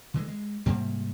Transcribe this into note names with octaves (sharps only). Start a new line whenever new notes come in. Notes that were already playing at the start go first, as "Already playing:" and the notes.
D3 E3 G#3
G#3
G#2 C3 G3 A#3